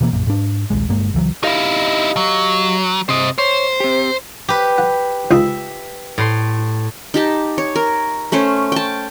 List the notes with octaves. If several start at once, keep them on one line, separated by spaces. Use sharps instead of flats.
B2 E3 A#3
A#1 F#2 A#2
G#2 D4
D#1 A#1 G#3
G1 G2 G#3 A#3
C#2 E3 F#3
D#4 E4 G4 D#5 F5
F#3
C3 C5 D#5
C5 C#5
C4 G4
G4 B4
F#5
C#2 D#4 F4 E5
A2 C6
D#4 G4 A5
C#5
A#4
A3 C#4 C5 C#5
G5 A5